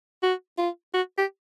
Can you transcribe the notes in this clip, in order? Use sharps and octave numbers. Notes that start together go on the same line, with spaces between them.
F#4
F4
F#4
G4